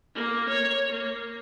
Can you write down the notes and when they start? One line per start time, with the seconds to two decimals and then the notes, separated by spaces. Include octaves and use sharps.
0.15 A#3
0.49 C#5
0.91 A#3